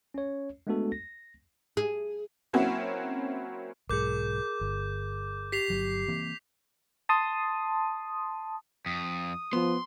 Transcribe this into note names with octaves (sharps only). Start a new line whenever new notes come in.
C#4 C#5
G#3 A3 B3 D4 F#4 A4
A#6
G#4
F#3 A#3 C4 C#4 E4 F#4
B1 G#2 G#4 A#4 D6 G6
G1
G4 B6 C7 F7
G1 F#3
E3 A#3 C4
A5 C6 D#6
F2 D#6
F3 B3 C6